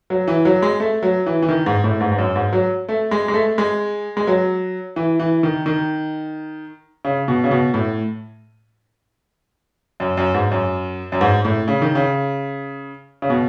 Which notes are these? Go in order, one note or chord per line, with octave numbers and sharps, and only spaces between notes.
F#3
E3
F#3
G#3
A3
F#3
E3
E3
D#3
G#2
A2
G#2
G#2
F#2
G#2
F#3
A3
G#3
G#3
A3
G#3
G#3
F#3
E3
E3
D#3
D#3
C#3
B2
C#3
B2
A2
F#2
F#2
G#2
F#2
F#2
G#2
A2
C#3
D#3
C#3
C#3
B2